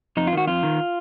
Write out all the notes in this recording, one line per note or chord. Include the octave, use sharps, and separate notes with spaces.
F2 D#4
F4
D#3 F#4
F2 F4
D#3